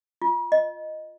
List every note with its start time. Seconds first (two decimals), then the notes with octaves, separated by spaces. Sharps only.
0.22 F4
0.52 D#5